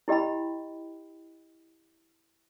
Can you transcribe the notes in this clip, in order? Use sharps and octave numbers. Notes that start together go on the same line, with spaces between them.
E4 G4 D#5 G5 B5